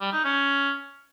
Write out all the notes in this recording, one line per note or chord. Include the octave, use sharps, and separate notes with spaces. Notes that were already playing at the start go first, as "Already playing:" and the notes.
G3
D#4
C#4